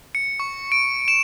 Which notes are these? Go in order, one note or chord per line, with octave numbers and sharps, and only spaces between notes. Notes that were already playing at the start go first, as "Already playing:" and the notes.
C#7
C#6
D7
E7